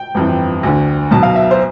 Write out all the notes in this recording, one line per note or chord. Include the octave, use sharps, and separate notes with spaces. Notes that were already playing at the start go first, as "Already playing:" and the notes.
Already playing: G5
G1 F2 E3
D2 D3
B1 B2 A5
F5
E5
C5